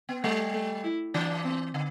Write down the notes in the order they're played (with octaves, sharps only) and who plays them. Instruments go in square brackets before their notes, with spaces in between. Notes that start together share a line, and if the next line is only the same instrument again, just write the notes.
[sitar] B3
[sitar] G3 [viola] A3
[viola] A3
E4
[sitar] E3 [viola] D4
[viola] C4
[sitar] D3